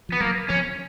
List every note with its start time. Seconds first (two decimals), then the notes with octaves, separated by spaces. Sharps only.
0.09 F3 B3
0.21 F#3 A#3
0.49 F3 C#4